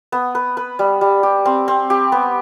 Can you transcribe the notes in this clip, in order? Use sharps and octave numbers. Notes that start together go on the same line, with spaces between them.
B3
B4
B4
G3
G3
G4
C4
C4
G4
B3